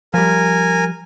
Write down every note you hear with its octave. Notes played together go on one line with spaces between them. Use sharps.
F3 G3 A#4 G#5